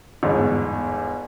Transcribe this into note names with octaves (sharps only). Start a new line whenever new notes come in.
G1 E2 G#2